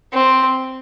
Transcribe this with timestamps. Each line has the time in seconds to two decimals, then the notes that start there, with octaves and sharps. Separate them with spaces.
0.13 C4